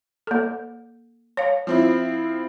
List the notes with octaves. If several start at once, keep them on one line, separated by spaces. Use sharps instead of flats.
A#3 A4
C#5 F5
F3 C4 E4